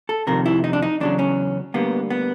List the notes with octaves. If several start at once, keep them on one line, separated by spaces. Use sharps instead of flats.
A4
F2 C3 D#3 A#4
E4
D#4
D4
D#4
E2 C#3 F#3 D4
C#4
D2 D3 G3 A#3 B3
B3